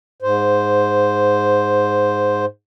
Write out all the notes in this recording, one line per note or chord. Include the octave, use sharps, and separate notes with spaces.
G#2 C5